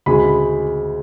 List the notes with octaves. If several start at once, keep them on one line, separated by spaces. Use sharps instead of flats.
D2 C#3 G#3 B5